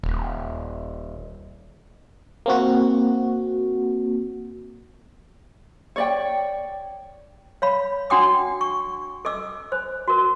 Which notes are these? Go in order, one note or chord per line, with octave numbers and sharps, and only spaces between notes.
D#1
A#3 C4 F#4
C#5 D5 G5
C#5 F5 B5
D4 F#4 F#5 G5 D6 D#6
C#6
A4 D#5 D6 E6
C5
F#4 A#4